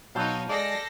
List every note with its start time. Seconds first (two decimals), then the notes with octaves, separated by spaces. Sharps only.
0.15 B2 F#3 C4 D#4 C#5 F5 A5 G6
0.49 G#3 A4 D5 A#6 C7